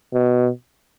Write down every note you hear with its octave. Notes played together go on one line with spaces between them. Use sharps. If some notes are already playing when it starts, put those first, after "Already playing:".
B2